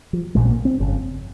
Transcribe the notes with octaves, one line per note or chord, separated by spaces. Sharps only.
F3
A#1 A#2 G#3
C4
A#3
C4
G1 F2 C#3